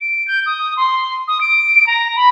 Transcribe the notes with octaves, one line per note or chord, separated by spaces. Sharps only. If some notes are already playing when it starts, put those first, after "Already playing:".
D7
G6
D#6
C6
D#6
D7
A#5
B5